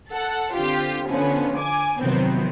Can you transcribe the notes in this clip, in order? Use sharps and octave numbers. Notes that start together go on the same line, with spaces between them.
A4 F#5
D3 C4 F4 G4
D3 F3 B3 C#4
G#5 D6
C3 D#3 F3 F#3 B3 C4